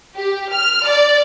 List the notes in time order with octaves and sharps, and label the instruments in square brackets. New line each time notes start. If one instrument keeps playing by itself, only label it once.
[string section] G4
F6
D5